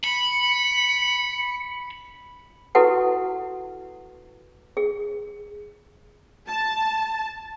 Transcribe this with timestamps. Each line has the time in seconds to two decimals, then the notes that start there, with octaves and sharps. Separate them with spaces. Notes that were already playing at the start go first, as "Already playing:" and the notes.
0.04 B5 C#7
2.75 E4 F#4 G4 A4 B4 F#5
4.77 G#4
6.49 A5